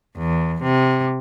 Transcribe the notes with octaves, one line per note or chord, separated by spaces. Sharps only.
E2
C3